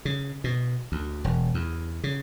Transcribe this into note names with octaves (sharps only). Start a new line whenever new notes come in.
C#3
B2
D2
E1
E2
C#3